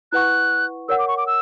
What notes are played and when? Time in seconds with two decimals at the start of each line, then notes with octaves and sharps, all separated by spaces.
0.12 E4 B4 F#5 C#6 F#6
0.88 A#4 C#5 F#5 E6
0.98 D6
1.08 C#6
1.17 D6
1.27 E6